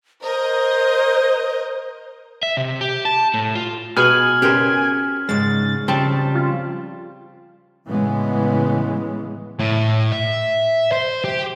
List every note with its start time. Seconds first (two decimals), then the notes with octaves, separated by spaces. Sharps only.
0.22 A#4 C5 D#5
2.43 E5
2.57 C3
2.81 G4
3.05 A5
3.34 A2
3.55 F4
3.96 B2 B3 G#4 G#5 F6 F#7
4.42 C#4 G4 G#4 A#4 C5
5.29 G#2 C#3 G#3 A6
5.88 C#3 F3 G3 C4 A5
6.35 F4
7.87 A2 C#3 E3 G#3 B3
9.59 A2
10.12 E5
10.92 C5
11.24 G4